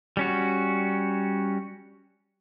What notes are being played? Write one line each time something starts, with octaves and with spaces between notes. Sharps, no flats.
G3 C#4 F#4